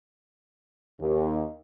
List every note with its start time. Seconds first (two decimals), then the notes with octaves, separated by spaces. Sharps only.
1.00 D#2